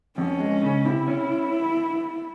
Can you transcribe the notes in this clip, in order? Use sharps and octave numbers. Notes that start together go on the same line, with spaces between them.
F2 C#4
G#3
C#3
C3 E4
C#4